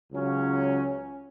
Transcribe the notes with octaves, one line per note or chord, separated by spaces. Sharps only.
C#2 C#3 F#3 C#4